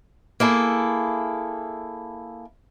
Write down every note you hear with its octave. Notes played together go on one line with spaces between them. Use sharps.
A#3 E4 G#4 A4